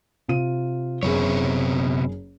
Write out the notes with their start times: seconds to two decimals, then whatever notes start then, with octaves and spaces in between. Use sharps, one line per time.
0.28 C3 F4 D#7
1.03 F#1 C3 B3 G#4 C#5